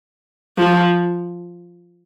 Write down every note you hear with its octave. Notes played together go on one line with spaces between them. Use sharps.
F3